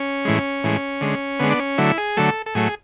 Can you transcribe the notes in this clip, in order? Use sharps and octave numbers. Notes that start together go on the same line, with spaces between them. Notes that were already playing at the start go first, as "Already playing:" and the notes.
Already playing: C#4
A2 E3 G#3
A2 E3 G#3
D3 G#3
D3 G#3 B3
D4
C#4
D3 F#3 A3 E4
G#4
D3 F#3 A3 A4
A4
A2 F#3 A3 G#4